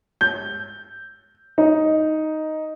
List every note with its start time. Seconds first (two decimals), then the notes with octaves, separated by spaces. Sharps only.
0.21 G6
1.58 D#4